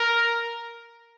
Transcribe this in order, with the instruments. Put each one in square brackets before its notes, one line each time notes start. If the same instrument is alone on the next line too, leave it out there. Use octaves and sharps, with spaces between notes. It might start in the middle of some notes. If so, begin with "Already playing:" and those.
Already playing: [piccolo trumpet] A#4